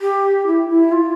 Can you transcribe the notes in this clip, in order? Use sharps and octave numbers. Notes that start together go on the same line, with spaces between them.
G4
E4
E4
F4